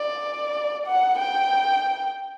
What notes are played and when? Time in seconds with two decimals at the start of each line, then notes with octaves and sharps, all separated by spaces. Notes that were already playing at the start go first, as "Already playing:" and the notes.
Already playing: D5
0.86 F#5
1.19 G5